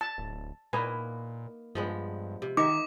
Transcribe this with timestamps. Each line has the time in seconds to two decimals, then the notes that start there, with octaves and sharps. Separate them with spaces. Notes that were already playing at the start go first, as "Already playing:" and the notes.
0.01 A5
0.18 D1
0.73 A#2 A#3 D#4 B4 G#5
1.75 G2 F3 G#3 B3
2.42 C3
2.57 D#3 D#4 C#5 E5 D6